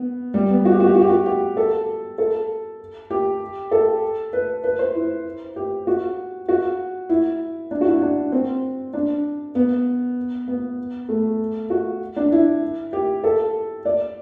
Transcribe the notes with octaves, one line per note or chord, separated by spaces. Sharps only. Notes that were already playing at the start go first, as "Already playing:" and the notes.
Already playing: B3
G3
B3
F#4
G4
F#4
G4
F#4
G4
F#4
G4
A4
A4
G4
A4
B4
B4
C5
E4
G4
F#4
F#4
E4
D4
F#4
E4
D4
C4
D4
B3
B3
A3
F#4
D4
E4
G4
A4
D5